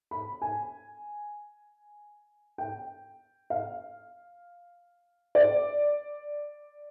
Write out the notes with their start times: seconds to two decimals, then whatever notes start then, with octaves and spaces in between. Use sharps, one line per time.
0.11 B5
0.42 G#5
2.58 G5
3.50 F5
5.35 D5